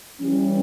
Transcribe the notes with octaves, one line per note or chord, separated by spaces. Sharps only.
E3 G3 C#4